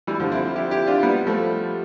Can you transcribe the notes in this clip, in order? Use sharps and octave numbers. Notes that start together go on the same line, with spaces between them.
E3 G3
D3 F3
C4 E4
E4 G4
E4 G4
D4 F4
G3 B3
F3 A3